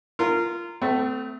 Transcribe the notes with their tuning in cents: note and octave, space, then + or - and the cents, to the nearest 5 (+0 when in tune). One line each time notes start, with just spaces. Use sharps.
F4 -20 A#4 -15
A3 +5 C4 -40